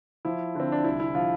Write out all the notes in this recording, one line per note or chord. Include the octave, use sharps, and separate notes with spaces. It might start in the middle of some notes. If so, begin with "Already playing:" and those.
F3 E4
D3 C4
D4
C2 E4
E4
F3 F4